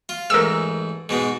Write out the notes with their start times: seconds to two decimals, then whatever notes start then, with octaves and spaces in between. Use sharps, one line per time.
0.09 F4
0.30 A1 G#2 A#4 E6
1.09 G#2 B2 G#3